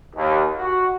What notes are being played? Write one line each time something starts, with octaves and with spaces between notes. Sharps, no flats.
D#2
F#4